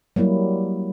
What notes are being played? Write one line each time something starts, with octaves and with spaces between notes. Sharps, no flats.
F#3 G3 A#3 E4